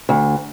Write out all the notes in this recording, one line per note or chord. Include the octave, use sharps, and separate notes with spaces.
D2